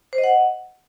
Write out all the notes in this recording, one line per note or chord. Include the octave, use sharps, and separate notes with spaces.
C5
D#5
F#5